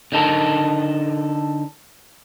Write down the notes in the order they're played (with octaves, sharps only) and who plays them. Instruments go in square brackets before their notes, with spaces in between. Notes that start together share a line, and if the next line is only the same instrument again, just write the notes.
[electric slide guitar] D3 D#4 A4 A#4